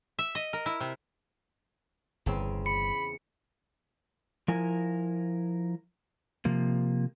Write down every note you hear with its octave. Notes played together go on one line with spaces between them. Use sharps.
E5
D#5
A#4
E4
C3
G1 E2 C#3 C4
B5 C#7
F3 E4 A#4 G#5
C3 F3 A#3